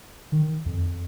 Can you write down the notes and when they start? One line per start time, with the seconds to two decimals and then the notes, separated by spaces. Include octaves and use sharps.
0.32 D#3
0.66 F2